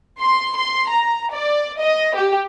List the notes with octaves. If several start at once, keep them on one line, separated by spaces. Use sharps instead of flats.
C6
C6
A#5
D5
D#5
G4